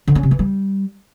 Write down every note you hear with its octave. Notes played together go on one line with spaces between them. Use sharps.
D3
C#4
C3
E3
G3